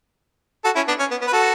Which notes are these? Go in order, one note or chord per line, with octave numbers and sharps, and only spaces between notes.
F#4 A4
C#4 E4
B3 D4
C#4
B3
B3
B4
F#4 A4